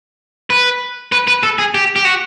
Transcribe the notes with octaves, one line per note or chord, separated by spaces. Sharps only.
B4
B4
B4
A4
G#4
G4
G4
F#4